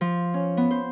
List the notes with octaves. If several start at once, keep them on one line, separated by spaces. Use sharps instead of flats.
F3
C#4
B3
C5